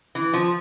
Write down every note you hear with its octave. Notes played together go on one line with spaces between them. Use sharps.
E3
F3